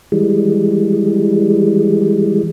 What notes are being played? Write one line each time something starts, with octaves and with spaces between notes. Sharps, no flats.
E3 G3 G#3